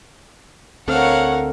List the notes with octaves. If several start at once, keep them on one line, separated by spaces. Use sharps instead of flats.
D2 C4 A4 A#4 C#5 F5 F#5